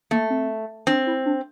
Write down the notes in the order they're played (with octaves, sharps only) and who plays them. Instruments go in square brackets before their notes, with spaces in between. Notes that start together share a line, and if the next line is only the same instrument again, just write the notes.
[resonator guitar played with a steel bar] A3 [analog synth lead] A#3
[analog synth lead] C4
[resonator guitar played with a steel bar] C4 [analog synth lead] D4
[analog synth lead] E4
D4